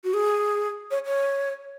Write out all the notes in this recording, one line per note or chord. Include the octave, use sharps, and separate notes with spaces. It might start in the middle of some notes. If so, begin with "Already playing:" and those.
F#4
G#4
C#5
C#5